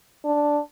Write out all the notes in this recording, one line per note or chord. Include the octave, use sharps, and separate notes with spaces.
D4